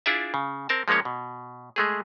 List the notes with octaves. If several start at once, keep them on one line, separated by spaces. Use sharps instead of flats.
D4 E4 F4 G#4 D5 E5
C#3
C4 A#4 A5
F3 G#3 A#3 C#4 C#5
B2
G#3 A3 G#4